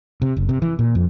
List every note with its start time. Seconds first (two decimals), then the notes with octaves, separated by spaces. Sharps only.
0.22 C3
0.37 F#1
0.49 C3
0.62 E3
0.79 A#2
0.95 F2